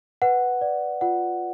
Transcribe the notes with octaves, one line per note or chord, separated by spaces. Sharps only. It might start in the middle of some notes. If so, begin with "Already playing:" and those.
B4 F#5
D5
F4 F#5